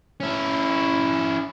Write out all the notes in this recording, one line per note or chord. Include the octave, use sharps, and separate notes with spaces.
C#4 E4